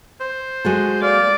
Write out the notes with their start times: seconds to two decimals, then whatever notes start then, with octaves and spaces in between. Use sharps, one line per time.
0.21 C5
0.65 G#3 F#4 A4
1.02 D5 F5